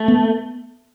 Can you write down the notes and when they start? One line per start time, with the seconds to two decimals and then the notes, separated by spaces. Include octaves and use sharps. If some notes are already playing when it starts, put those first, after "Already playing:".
Already playing: A3
0.08 B3